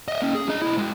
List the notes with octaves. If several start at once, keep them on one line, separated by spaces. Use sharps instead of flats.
D#5 E5
A#3 C#4
G#4
D4 D#5
B1 E4
G#3 F#4